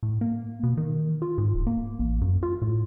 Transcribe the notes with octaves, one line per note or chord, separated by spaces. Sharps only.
A2
A#3
B2
D#3
F4
G#2
D1
A#3
A1
F#2
F4
A2